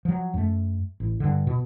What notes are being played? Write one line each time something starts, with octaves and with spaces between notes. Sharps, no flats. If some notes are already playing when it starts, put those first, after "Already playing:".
F3 F#3
F#2 A3
A1
G2 D3
B2